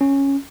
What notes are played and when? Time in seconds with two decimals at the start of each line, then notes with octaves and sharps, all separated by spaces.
0.01 C#4